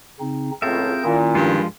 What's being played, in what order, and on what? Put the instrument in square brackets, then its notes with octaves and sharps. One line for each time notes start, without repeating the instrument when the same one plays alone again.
[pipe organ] C#3 C4 D#4
[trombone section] C#2 A2 [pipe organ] C4 G#4 G6 [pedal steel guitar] F4 A#4 E5
[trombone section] A#2 [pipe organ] D#3 C#4 E4
[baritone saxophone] G2 [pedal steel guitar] F3 G#3 F4